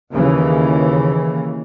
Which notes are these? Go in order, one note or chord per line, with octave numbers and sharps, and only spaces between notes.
D#2 C#3 E3